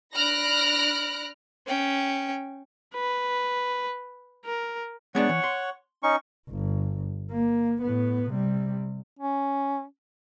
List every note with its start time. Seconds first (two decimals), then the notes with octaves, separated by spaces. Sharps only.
0.15 D4 B5 F6 F#6 A#6 D7
1.67 C#4 G5
2.94 B4
4.45 A#4
5.15 G#3 B3 D4 C#5 F#5 C#6
5.29 E3
5.44 C6
6.03 C#4 D#4 C#6
6.50 G1
7.31 A#3
7.82 A2 B3
8.30 C3 G3
9.19 C#4